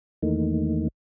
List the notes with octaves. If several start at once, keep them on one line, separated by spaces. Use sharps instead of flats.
E2 D#3 E3 A3 A#3 D#4